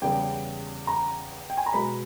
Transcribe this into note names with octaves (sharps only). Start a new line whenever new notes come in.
E2 C#3 G3 B3 G5
A#5
G5
G#5
A#5
B2 G#3 B3 B5